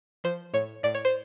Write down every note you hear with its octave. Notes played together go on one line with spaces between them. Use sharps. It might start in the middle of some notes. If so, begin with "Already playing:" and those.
F3 C5
A2 C#5
A2 D5
C#5
C5